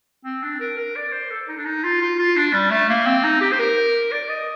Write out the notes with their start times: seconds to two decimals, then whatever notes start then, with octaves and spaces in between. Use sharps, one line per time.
0.25 C4
0.43 D4
0.60 A#4
0.78 A#4
0.96 D5
1.13 C5
1.31 A4
1.49 D#4
1.57 D4
1.65 D#4
1.84 F4
2.01 F4
2.19 F4
2.37 D4
2.53 G3
2.71 A3
2.90 A#3
3.07 C4
3.24 D#4
3.41 G4
3.52 C5
3.60 A#4
4.12 D5
4.29 D#5